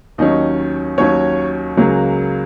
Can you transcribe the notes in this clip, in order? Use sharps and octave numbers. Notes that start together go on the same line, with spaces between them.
D#2 D#3 F#3 C#4 D#5
D#2 D#3 F#3 C#4 C#5
C#2 C#3 F#3 A#3